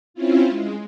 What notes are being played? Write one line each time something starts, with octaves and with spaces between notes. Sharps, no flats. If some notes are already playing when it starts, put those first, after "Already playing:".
C4 C#4 E4 F4
G#3